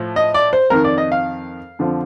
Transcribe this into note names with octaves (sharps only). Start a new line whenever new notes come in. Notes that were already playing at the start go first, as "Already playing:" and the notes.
Already playing: A2 F3
D#5
D5
C5
F2 D#3 A#4
D5
D#5
F5
F2 D3 F3